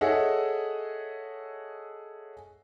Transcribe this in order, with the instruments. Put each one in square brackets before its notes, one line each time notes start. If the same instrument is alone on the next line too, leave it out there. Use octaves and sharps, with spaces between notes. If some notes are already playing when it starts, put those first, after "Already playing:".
[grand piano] G#4 A4 C#5 D#5 E5 F#5